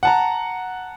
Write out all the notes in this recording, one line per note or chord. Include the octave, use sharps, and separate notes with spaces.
F#5 A5 A#5